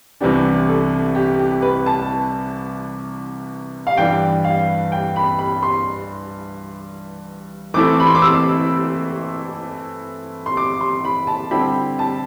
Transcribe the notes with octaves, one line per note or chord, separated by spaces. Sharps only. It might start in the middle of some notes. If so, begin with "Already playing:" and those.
C2 C3 E3 B3 D4 G4
A4
G4
G4
B4
A5
F5
G2 E3 G3 B3 D4 G5
F5
G5
B5
B5
C6
E3 A3 C4 E4 A4 D6
B5
C6
D6
E6
C6
D6
C6
B5
A5
D3 G3 C4 E4 G4 B5
A5